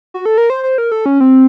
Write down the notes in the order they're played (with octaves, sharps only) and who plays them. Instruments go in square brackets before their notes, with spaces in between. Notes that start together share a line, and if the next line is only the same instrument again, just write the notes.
[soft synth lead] F#4
A4
A#4
C5
C5
A#4
A4
C#4
C4